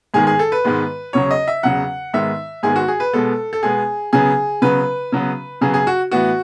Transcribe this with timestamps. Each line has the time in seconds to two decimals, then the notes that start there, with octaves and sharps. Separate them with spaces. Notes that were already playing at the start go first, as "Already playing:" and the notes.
0.14 G#2 D#3 G#3 B3 G#4
0.27 G#4
0.39 A4
0.52 B4
0.64 G#2 D#3 G#3 B3
1.13 E2 C#3 F#3 C#5
1.31 D#5
1.48 E5
1.63 E2 C#3 F#3 F#5
2.14 G#2 D#3 G#3 B3 E5
2.63 G#2 D#3 G#3 B3 G#4
2.76 F#4
2.88 G#4
3.00 B4
3.13 B2 G#3 B3 A4
3.53 A4
3.63 B2 G#3 B3 G#4
4.13 C#3 F#3 B3 G#4
4.62 C#3 F#3 B3 B4
5.12 C#3 F#3 B3
5.61 C#3 F#3 B3 G#4
5.74 G#4
5.87 F#4
6.11 A2 E3 B3 F#4